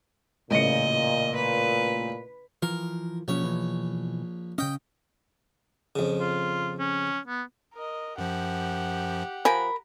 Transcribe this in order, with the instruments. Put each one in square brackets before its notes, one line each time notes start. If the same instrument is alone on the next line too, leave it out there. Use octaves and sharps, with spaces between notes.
[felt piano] A1 C#3 C#7 [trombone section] A#2 [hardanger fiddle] D#5
[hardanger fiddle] B4
[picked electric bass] E3 F3 [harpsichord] A#4
[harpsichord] A#1 C#5 [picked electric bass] B2 C#4
[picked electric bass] B2 E3
[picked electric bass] C#3 C#4 [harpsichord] D#5 G5
[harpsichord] F2 C#3
[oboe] F4
C#4
B3
[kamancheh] A#4 D#5
[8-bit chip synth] F#2 F3 [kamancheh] G4 F#5
[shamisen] F3 G#5 [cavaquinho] A#4 B5